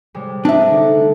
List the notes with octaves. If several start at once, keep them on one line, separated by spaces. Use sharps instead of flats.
C3 G3 G#3
G3 D4 D#4 G#4 E5
D3 A3